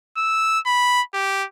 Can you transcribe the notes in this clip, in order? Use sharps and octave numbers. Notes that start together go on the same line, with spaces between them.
E6
B5
G4